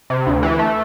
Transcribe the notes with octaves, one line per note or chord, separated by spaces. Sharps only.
C3
D2
E3
A3